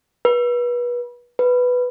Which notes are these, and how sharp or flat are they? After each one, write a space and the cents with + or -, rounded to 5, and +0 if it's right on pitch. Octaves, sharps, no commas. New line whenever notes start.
B4 -30
B4 +5